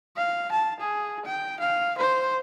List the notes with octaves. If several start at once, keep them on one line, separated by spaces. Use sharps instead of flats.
F5
A5
G#4
G5
F5
C5